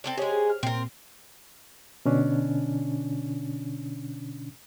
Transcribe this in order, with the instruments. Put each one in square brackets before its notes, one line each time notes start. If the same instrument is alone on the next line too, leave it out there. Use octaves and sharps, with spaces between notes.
[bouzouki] C4 A4 D5
[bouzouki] G#3 G#4 [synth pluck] G4 C5 C#5
[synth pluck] F6
[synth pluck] A#2 [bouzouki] C4 A#4
[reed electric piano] B2 D3 C#4 D4